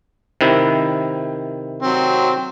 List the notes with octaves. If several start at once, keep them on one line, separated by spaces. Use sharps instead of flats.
C3 D#3 E4
F#3 C4